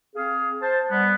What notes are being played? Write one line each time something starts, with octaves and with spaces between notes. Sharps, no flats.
C4 G#4 F5
C5 A5
G3 B3